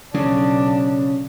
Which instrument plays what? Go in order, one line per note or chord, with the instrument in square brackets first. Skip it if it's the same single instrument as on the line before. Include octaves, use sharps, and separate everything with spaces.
[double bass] B1 D4 [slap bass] C#3